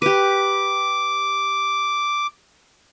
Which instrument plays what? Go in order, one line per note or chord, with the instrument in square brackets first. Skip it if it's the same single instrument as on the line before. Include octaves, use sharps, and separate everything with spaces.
[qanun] G4 B4 [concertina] D6